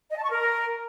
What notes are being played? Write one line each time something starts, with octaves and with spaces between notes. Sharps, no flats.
D#5
A5
C#6
A#4